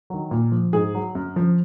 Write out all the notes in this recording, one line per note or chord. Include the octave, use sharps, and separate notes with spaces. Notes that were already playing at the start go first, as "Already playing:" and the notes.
D#3 F#3
A#2
F3
G#2 G#4
F#3
F#2
F3